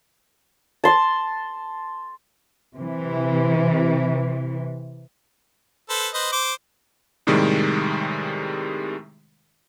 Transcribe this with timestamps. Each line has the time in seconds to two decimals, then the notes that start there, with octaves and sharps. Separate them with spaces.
0.84 A5 C6
2.76 C3 E3
5.90 A4 B4 C5
6.14 B4 C5 D#5
6.32 C5 D6
7.27 A2 C3 D#3 G3 G#3